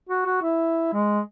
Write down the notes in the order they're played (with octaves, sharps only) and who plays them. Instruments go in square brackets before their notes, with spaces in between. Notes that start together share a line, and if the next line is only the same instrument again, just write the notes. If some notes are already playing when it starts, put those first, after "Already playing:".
[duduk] F#4
F#4
E4
G#3